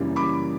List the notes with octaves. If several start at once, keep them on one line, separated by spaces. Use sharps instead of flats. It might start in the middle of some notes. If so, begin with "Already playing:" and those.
Already playing: F#2 C#3 E3 G3 A#3
B5 D6